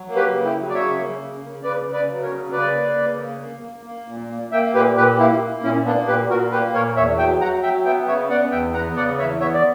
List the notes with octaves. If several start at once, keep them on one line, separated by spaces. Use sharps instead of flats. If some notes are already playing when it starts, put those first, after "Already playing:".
Already playing: F#3
A#3
G4 B4
C#3
E4 G4
F#3
D5
C#3 C#5 E5
A#3
C#3
C#3
C#3 B4 D5
C#3
B4 D5
F#3
A#4 C#5
C#3
C#3 B4 D5
A#3
C#3
A#3
A#3
A#3
A#3
A#2
A#3
A#3 E5 G5
A#2 G4 B4
A#2 G4 B4
A#3 E4 G4
A#3
A#2 C#4 E4
A#3 B3 D4
A#2 G4 B4
A#2 F#4 A#4
A#3 G4 B4
A#2 A#4 C#5
E2 C#5 E5
F#3 E5 G5
F#3 F#5 A#5
F#3 E5 G5
B3 E5 G5
C#3 C#5 E5
B3 D5 F#5
E2 E5 G5
B3 F#5 A#5
C#3 D5 F#5
E2 C#5 E5
B3 C#5 E5
D5